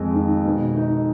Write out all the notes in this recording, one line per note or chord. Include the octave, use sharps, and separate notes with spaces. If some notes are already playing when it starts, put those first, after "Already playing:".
Already playing: F2 G#3
D#3
B2
D#4